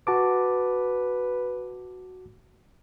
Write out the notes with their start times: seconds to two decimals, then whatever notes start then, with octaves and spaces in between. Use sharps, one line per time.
0.07 F#4 B4 A5 D6